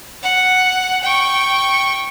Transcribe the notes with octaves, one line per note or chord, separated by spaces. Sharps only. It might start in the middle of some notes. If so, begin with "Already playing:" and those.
F#5
G5 C#6